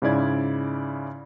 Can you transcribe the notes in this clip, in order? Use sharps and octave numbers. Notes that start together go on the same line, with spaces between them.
G#2 C#3 E4 D5 G#6